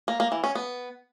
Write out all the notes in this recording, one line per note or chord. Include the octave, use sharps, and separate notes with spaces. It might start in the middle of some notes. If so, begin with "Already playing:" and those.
A#3
A#3
E3
C#4
B3